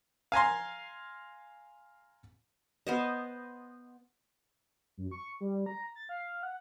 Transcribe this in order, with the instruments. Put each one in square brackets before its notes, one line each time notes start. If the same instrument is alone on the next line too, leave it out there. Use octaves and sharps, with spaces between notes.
[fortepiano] F5 G#5 A#5 C6
[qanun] B3 C5 D#5
[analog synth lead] F#2
C#6
G3
A#5
A6
F5
F#5